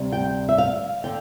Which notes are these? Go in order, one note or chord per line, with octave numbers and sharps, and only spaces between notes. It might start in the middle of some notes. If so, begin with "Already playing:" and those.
Already playing: D2 C3 G3
G5
E5
F5
D3 G5